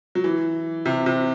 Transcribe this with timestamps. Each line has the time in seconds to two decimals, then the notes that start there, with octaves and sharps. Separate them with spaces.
0.15 F#3
0.24 E3
0.85 C3
1.06 C3